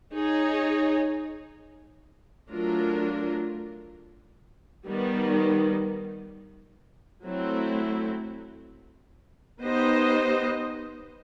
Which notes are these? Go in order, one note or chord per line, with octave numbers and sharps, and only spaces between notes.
D#4 G#4 C#5
F#3 A3 D4 F4 A#4
D#3 G3 B3
F#3 A3 C4 E4
B3 D#4 G4 C5 D#5